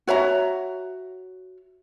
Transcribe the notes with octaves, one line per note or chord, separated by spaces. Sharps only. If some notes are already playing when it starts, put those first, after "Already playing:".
F#4 C#5 E5 A#5